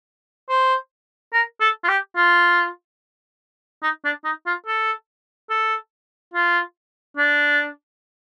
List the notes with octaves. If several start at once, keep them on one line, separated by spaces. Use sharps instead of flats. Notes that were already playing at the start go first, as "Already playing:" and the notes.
C5
A#4
A4
F4
G4
F4
D#4
D4
D#4
F4
A4
A4
F4
D4